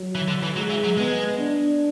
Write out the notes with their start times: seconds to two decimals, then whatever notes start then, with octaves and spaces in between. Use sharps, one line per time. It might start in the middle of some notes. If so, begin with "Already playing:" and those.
Already playing: F#3
0.15 E3
0.28 D3
0.43 E3
0.56 F#3 G#3
0.69 E3
0.84 F#3
0.97 G#3 B3
1.38 D4